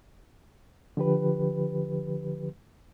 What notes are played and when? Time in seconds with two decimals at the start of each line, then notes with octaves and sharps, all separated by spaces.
0.97 D3 F3 G4 B4